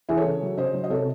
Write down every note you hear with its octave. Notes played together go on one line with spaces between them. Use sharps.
E3 E4 G#4
A4 C#5
C#3
F#3
C#3 C5 D#5
F#3
D#5
C3 A4 C#5